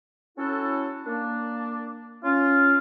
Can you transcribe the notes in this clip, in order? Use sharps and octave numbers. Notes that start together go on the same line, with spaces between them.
C#4 E4 F#4 A4
A#3 D4
C#4 F4